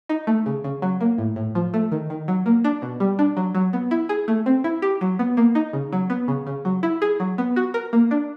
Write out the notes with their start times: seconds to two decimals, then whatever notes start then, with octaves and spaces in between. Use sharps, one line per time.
0.09 D#4
0.27 A3
0.46 C#3
0.64 C#3
0.82 F#3
1.01 A#3
1.18 A2
1.36 A2
1.55 F3
1.74 A3
1.92 D#3
2.10 D#3
2.28 F#3
2.46 A#3
2.64 D4
2.82 B2
3.00 G3
3.19 D4
3.37 F#3
3.55 F#3
3.73 B3
3.91 E4
4.09 G#4
4.28 A3
4.46 C4
4.64 E4
4.82 G4
5.01 F#3
5.19 B3
5.37 A#3
5.55 D#4
5.73 C#3
5.93 F#3
6.10 B3
6.28 C#3
6.47 C#3
6.65 F#3
6.83 E4
7.02 G#4
7.20 F#3
7.38 B3
7.56 F#4
7.74 A#4
7.93 A#3
8.11 D4